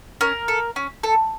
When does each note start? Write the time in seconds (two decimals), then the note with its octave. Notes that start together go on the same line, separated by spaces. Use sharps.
0.21 C#4 A#4
0.48 A4
0.76 C#4
1.03 A4